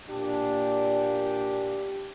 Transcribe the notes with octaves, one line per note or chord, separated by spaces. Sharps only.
A#2 D4 G4